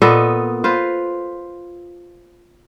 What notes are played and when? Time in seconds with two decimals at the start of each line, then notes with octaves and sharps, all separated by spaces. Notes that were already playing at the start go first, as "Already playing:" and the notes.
0.02 A#2 B3 A4 D#5
0.64 F4 B4 C5